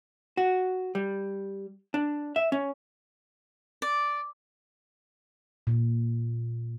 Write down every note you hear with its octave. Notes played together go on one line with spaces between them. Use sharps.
F#4
G3
D4
E5
C#4
D5
A#2